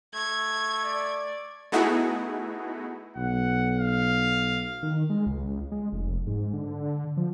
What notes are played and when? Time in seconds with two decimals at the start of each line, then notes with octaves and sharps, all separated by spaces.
0.14 A3 G#6
0.84 D5
1.72 A3 B3 D#4 E4 F#4 G#4
3.16 B1 F#5
3.79 F5
4.83 D#3
5.10 G#3
5.26 C#2
5.72 G#3
5.92 F1
6.27 G#2
6.54 D3
7.17 F3